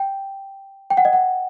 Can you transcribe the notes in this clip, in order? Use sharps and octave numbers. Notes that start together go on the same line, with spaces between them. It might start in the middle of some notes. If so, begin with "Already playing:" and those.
Already playing: G5
G5
F#5
D#5
F#5